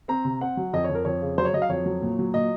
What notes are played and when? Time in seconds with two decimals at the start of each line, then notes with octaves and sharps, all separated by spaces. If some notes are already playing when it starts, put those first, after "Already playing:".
0.08 C4 A#5
0.25 C3
0.41 C4 F#5
0.57 F#3
0.73 F2 D#5
0.84 C#5
0.90 F2
0.95 A#4
1.05 F2 C#5
1.21 C#3
1.38 F#3 C5
1.45 C#5
1.53 F#3 D#5
1.62 F5
1.69 F2 C#5
1.86 F#3
2.02 A#2
2.19 F#3
2.34 A#2 D#5